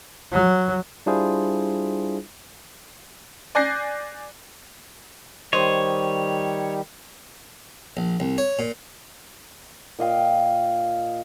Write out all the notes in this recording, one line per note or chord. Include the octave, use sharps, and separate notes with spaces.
F#3
G3 D4 E4 F4 G#4 C5
D5 G#5 F#6 G6 A#6 C7
D#3 G3 C5 C#5 D#5
A#1
C2
C#5
A#2
A#2 D#5 F5 G5